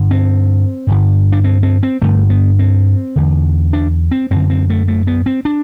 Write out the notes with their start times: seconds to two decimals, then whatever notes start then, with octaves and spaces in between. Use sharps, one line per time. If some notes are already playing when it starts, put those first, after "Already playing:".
Already playing: G2 D3
0.11 C4
0.87 G2 D3
1.32 D4
1.44 C4
1.63 C4
1.83 C4
2.02 G2 D3 A3
2.30 B3
2.59 C4
3.16 E2 D3
3.73 D4
4.11 C4
4.31 F#2 D3 C4
4.50 C4
4.70 A3
4.88 A3
5.07 B3
5.26 C4
5.45 D4